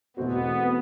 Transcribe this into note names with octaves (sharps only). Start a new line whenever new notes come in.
E2 B2 A3 B3 C4 F#4